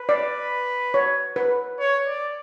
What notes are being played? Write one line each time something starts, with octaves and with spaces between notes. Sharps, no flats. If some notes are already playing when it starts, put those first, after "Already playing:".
Already playing: B4
D5
C#5
B4
C#5
D5